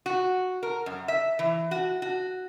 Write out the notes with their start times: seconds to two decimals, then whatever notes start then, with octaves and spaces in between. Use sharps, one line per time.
0.06 F#4
0.63 A#4
0.86 F#2
1.08 E5
1.39 E3
1.71 F#4
2.02 F#4